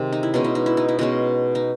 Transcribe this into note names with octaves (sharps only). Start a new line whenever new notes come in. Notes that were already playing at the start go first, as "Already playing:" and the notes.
Already playing: C3 D#3 G#3 C4
D#4
E4
B2 G#3 C#4 D#4
E4
D#4
E4
D#4
E4
B2 G#3 C#4 D#4
D#4